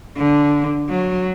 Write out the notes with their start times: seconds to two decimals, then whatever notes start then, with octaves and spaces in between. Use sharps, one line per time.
0.18 D3
0.90 F#3